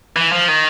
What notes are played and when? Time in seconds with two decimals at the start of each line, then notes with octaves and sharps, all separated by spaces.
0.16 E3
0.32 F3
0.48 D#3